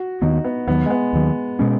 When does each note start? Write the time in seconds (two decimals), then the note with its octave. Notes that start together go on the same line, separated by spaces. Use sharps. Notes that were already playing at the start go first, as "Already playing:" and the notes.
Already playing: F#4
0.22 D#2 D#3 B3 D#4
0.44 B3
0.67 D#2 D#3 F#3 B3
0.86 G#3
0.90 B3
1.13 D#2 D#3 F#3
1.59 B2 G#3 C#4